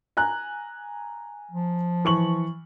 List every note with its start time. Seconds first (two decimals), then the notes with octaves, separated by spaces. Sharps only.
0.17 G#5 A#5 F#6
1.51 F3
2.05 E3 C#6 F#7